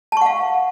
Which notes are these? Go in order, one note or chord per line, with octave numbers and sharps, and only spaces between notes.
F5 F#5 A5 C#6